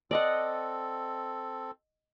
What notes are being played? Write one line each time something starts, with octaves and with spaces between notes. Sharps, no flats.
C4 A4 D5 D#5 F#5